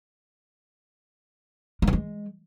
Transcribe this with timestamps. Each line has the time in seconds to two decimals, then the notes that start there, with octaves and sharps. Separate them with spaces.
1.82 A#3
1.87 E3
1.93 G#3